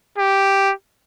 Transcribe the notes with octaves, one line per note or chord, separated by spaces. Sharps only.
G4